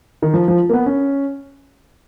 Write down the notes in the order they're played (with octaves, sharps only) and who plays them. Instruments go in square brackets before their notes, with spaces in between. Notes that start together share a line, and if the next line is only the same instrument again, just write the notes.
[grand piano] D#3
F3
F3
A#3
B3
C#4